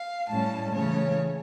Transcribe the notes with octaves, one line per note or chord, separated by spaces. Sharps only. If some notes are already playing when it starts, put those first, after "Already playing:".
Already playing: F5
A2 G3 C#4 A5
C#3 E3 A3 C#4 C#5